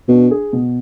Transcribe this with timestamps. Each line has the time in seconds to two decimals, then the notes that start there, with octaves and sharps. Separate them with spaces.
0.08 B2 D4
0.31 G#4
0.53 B2